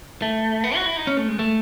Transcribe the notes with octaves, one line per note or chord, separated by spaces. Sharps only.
A3
B3
F#4
E4
D#4
C#4
A3
G#3
A3